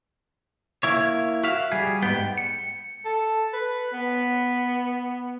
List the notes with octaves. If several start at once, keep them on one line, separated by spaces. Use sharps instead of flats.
A#3 E4 C#5
F#4 E5 F5
G3 G#4
G#2 B3 G5
C#7
A4
B4
B3